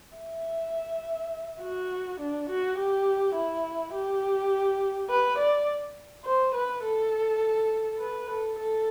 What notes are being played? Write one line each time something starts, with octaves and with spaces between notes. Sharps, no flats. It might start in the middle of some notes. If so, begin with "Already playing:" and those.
E5
F#4
D4
F#4
G4
E4
G4
B4
D5
C5
B4
A4
B4
A4
A4